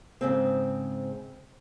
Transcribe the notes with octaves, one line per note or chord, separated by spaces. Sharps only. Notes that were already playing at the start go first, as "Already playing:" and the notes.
G#2 C#3 C4